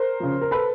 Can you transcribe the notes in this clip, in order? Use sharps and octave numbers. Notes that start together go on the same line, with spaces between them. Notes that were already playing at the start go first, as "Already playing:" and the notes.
Already playing: A#4 C5
C#3 F3
A#4
A4 B4